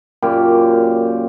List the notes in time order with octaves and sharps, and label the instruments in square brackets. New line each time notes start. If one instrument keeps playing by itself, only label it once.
[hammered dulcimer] F#2 A#2 G4